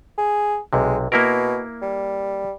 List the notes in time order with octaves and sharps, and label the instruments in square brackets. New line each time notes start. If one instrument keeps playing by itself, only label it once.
[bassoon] G#4
[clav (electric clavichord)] B1 C3 [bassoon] G#3
[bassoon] B2 [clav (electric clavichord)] A#3 E4 A#4
[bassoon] G3